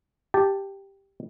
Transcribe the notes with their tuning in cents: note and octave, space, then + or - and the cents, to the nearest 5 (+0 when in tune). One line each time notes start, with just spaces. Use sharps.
G4 +0 A5 +0